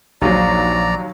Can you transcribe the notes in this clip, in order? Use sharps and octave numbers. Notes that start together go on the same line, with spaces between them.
A#1 D#2 F#3 D5 A#5